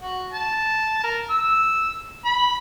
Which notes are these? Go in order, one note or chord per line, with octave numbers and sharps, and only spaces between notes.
F#4
A5
A#4
E6
B5